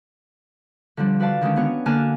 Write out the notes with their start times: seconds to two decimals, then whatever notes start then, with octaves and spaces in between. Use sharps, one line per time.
0.97 D3 F3 G3 D4
1.20 F#4 B4 D5 F5 A5
1.41 D3 D#3 G#3 C#4
1.56 B3 C#4 D4 F#4 C#5
1.86 D3 A#3 G#5 A5 F6 F#6